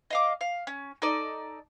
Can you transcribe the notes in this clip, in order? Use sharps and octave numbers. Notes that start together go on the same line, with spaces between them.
D#5 F5 D6
F5
C#4
D#4 A4 D5